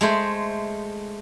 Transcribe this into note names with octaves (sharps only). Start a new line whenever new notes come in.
G#3 A3 C5